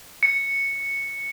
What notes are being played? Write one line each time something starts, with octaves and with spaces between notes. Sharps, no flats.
C#7